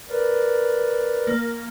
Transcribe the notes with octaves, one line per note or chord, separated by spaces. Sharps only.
A#4 B4 D5
A#3